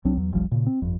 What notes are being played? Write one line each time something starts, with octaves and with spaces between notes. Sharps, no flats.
C2 F#3 C4 D4
E2 F#3
F1 B1 F3 G3
A#2 C#3
C4
G1 F2